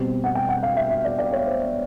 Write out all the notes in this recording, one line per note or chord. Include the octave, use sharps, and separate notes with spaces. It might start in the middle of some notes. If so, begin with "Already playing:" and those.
Already playing: B2 G3 C4
F#5
G5
F#5
F5
E5
E5
D5
D5
C#5
C5